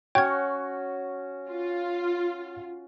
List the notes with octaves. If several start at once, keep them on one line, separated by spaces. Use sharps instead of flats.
C#4 F#4 C#5 G5 G#6
F4